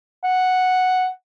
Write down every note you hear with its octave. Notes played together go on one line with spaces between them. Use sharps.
F#5